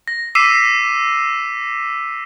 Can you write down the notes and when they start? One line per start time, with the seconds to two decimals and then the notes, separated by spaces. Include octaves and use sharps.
0.08 A#6
0.35 D6 E6 B6 C7 D#7 E7